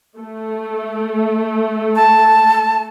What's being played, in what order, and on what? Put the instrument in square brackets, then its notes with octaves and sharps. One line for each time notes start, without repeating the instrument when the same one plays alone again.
[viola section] A3
[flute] A5